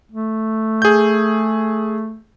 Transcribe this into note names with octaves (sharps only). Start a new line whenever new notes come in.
A3
G#4 G6